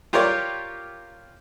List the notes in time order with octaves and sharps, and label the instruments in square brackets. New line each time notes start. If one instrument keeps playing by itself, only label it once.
[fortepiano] F4 G4 A#4 C#5 D5 F5